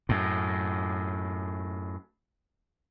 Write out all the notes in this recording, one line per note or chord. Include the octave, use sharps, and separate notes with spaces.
F#2 A2